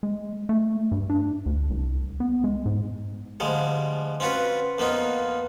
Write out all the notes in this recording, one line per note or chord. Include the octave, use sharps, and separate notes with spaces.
G#3
A3
G2
D4
D2
C2
B3
G#3
G#2
D2 F3 G3 G#3
C4 C#4 F4 F#4 B4
F2 A#3 B3 D#4 F4